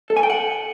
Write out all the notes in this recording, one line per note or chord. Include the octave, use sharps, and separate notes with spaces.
A4
G#5
G5
F#5